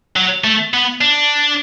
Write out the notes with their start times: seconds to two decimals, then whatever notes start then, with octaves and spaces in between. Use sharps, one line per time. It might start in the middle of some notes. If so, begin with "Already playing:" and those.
0.16 F#3
0.44 A3
0.73 B3
1.01 D4